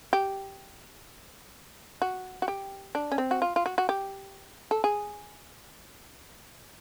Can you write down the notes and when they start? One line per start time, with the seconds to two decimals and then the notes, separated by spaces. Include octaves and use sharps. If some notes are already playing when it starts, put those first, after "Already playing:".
0.13 G4
2.02 F#4
2.42 F#4
2.48 G4
2.95 D4
3.12 C#4
3.18 C4
3.31 F#4
3.42 F4
3.56 F4
3.66 F#4
3.78 F#4
3.89 G4
4.71 A4
4.84 G#4